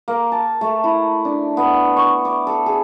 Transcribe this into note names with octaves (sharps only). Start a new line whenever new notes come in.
A#3
A5
A3
E4
D4
B3
C#6
D6
A4
G#4